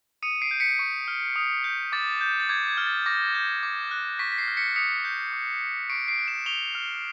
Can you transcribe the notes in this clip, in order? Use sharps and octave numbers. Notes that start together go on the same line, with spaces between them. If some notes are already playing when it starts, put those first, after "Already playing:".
D#6 C#7 D#7
C7 D7
G6
B6 C#7
C#6
F6
D#6
G6
D6 A6
G6
A6
D6 G#6
G#6
F6
A6
D6 A#6
G6
D6
F#6
C#6 B6
B6
C7
F6
B6 C#7
D#6 B6 C#7
G6
D6
G6
C#6 C7 D7
C7 D7
F#6
D7 E7
C#6 F7 G7
F6